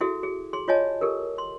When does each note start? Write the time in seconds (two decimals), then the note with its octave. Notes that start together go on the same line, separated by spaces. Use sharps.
0.01 E4 F#4 G#4 A4 E5
0.23 G#4
0.53 G#4 C6
0.68 F4 C#5 D#5 G#5 A5
1.01 G4 A4 A#4
1.38 C6